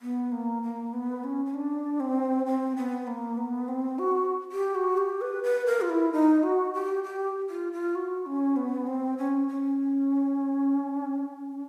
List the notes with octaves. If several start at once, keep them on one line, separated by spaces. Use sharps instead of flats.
B3
A#3
A#3
B3
C#4
C#4
D4
C4
C4
B3
A#3
B3
C4
F#4
G4
F#4
G4
B4
B4
A#4
F4
E4
D#4
F#4
G4
G4
F4
F4
F#4
C#4
B3
C4
C#4
C#4